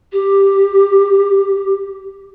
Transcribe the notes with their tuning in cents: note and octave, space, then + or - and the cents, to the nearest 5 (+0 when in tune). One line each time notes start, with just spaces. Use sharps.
G4 +0